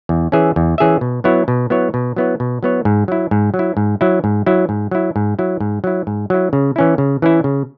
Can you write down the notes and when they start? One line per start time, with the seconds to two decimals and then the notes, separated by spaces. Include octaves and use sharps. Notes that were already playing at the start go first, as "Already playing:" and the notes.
0.09 E2
0.32 E3 C#4 G#4 E5
0.56 E2
0.78 E3 C#4 G#4 E5
1.01 B2
1.24 F#3 B3 E4 C#5
1.48 B2
1.70 F#3 B3 E4 C#5
1.94 B2
2.16 F#3 B3 E4 C#5
2.40 B2
2.63 F#3 B3 E4 C#5
2.85 G#2
3.08 F#3 E4
3.31 G#2
3.54 F#3
3.59 E4
3.77 G#2
4.01 F#3 E4
4.24 G#2
4.46 F#3 E4
4.69 G#2
4.91 F#3 E4
5.16 G#2
5.39 F#3 E4
5.60 G#2
5.84 F#3 E4
6.07 G#2
6.30 F#3 E4
6.53 C#3
6.76 E3 C#4 E4
6.98 C#3
7.22 E3 C#4 E4
7.44 C#3